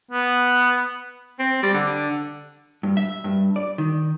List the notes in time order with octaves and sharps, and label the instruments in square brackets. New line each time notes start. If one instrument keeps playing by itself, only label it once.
[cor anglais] B3
[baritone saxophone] C4
G3
D3
[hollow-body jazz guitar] G2
E5
G2
D5
D#3